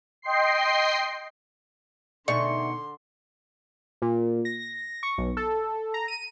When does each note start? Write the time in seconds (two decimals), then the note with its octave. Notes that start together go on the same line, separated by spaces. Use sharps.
0.22 D#5 G5 C6 C7
2.28 B2 D3 D#4 G#4 D5 E5 C6 C#6
4.02 A#2
4.45 A#6
5.03 C#6
5.18 B1
5.37 A4
5.94 A#5
6.08 D#7